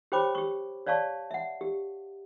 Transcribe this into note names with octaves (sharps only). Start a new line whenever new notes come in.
G4 C5 C#5 G5 B5 D6
G4 C#6
C#5 D5 F5 A5 C#6
E5 F#5
G4